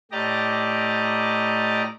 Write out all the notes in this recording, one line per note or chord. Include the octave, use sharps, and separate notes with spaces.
A2 G4 D5 D#5 A#5